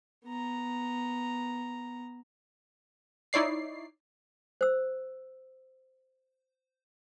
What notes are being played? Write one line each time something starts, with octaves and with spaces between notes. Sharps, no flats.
B3 A#5
D#4 E4 C#5 D5 C7
C5 E6